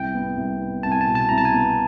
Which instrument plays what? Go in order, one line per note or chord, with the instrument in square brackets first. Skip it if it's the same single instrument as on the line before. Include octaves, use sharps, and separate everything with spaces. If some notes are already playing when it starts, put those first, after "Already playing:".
Already playing: [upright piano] C2 [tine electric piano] G5
[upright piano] B3
C2
B3
[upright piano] C2 [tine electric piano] A5
[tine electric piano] G#5
A5
[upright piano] B2
[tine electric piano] A5
[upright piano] C2 [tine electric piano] A#5
[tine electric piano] A5
G#5
[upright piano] B3